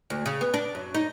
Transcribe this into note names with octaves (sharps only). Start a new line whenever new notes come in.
D2
C#3
B3
D4
F#2
D#4